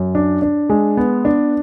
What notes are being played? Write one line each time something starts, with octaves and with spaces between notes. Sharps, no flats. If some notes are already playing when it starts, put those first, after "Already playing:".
Already playing: F#2
D4
D4
G#3
B3
D4